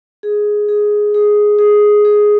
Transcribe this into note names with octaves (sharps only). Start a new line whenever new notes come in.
G#4
G#4
G#4
G#4
G#4